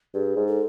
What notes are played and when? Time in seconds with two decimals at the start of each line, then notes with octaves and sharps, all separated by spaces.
0.14 G2 G#4
0.36 G#2
0.48 A4